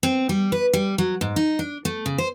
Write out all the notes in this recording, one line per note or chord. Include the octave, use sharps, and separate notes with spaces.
C4
G3
B4
G3
F#3
G#2
D#4
D4
A3
C#3
C5